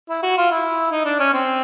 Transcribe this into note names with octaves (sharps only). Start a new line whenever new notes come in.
E4
F#4
F4
E4
D#4
D4
C#4
C4